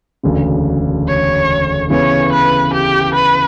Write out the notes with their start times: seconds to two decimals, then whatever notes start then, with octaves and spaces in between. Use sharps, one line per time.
0.23 E1 D2 C#3
1.07 C#5
1.90 C#3 E3 B3 C#5
2.32 B4
2.73 G4
3.15 B4